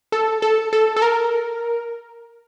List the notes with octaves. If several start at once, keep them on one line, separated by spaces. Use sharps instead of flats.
A4
A4
A4
A4
A#4